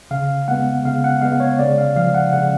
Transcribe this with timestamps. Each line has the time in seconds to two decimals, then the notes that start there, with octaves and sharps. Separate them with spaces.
0.11 C#3 F5
0.48 G#3 B3 F#5
0.85 C#3 F5
1.04 F#5
1.22 G#3 B3 F5
1.40 C#5
1.59 C#3 D5
1.78 F5
1.96 F3 G#3 F5
2.14 F#5
2.33 C#3 F#5